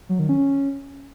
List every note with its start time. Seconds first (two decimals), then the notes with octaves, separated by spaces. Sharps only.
0.09 F#3
0.19 D#3
0.29 C#4